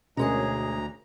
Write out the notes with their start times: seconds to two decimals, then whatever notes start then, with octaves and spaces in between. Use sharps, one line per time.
0.17 D2 B2 G#3 C#4 G#4 A#4 C#5 A#5